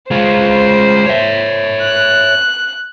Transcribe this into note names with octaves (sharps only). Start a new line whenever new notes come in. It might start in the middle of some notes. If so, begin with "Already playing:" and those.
G#3 F4 C5
C#5 E5
F#6